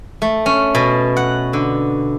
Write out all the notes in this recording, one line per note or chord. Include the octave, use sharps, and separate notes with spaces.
A3
C#4
B2
F#5
D3